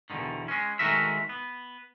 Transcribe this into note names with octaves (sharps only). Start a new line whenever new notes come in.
E2 G2 B2 D3 D#3
G#3 C#4
D#3 G#3 A3 F#4 A#4 E5
B3